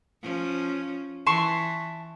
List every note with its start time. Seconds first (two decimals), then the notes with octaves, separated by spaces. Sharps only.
0.22 F3 C#4
1.27 E3 A5 C6 C#6